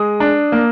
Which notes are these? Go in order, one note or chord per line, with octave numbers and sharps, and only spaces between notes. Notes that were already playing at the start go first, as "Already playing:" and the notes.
Already playing: G#3 D#6
D4
A#3